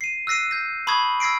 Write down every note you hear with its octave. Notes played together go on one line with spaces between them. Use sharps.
C7 D#7
E6 F#6 A#6 C7 D#7
G6 A#6
A5 B5 C#6 D#6 G#6
E6 G#6 A#6 C7 D7